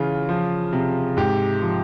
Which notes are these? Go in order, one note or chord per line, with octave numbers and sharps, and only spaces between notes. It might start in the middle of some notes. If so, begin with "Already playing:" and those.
Already playing: C#3 E3 F4
F3
C3
G#2 G4
F3